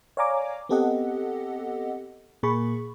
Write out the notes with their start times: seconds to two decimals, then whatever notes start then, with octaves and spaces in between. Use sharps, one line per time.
0.17 C#5 D5 F5 G#5 A#5 D6
0.69 B3 C4 G4 A4 D#5 F#5
2.43 A#2 A#3 G#4 B5 C#6